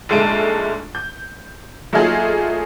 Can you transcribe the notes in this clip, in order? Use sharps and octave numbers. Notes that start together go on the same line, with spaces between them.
A#1 G#2 G#3 A3 A5 D7
G6
F#3 A3 A#3 D#4 F4 G#4